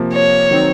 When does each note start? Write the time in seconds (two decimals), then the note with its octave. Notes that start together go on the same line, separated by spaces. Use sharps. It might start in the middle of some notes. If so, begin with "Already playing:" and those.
Already playing: C3 F3 A#3
0.14 C#5
0.51 D#3 F#3 C4 D#4